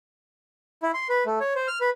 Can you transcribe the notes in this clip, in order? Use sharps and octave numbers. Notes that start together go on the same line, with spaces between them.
E4
C6
B4
A3
C#5
C5
F6
B4